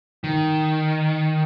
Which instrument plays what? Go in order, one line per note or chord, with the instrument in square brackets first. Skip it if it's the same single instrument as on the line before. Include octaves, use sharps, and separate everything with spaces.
[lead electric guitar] D#3